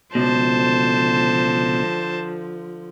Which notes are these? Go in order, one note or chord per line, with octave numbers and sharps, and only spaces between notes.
C#2 B2 D3 F3 C5 A5